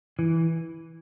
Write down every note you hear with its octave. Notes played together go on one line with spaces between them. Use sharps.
E3